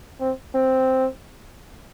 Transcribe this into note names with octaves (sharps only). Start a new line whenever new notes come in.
C4
C4